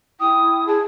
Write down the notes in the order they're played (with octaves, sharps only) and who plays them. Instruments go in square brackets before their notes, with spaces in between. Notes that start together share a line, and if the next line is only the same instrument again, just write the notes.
[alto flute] E4 [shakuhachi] G5 [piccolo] D#6
[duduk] G#4 [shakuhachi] A5